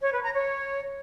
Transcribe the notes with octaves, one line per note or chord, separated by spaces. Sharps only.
C#5
B4
A#5
C#5